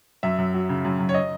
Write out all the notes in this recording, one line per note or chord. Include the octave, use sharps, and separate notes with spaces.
F#2 E5
F#2
F#3
C#3
F#2
F#2
C#5
D#5